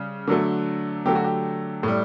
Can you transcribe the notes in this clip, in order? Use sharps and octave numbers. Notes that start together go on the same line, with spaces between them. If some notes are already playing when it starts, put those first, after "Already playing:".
Already playing: C#3 G3
D3 F#3 A3
D3 F#3 A3 G4
F#4
G4
A2 G3